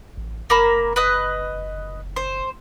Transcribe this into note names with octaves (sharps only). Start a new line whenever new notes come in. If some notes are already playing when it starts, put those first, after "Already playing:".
A1
F#1 A#3 A#4 B5
B4 D#5
C5